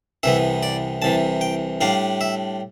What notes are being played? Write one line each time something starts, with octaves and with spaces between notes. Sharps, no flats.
C2 C3 E3 B3 E5
D5
C2 C3 E3 A5
G5
A2 G3 D4 F5
E5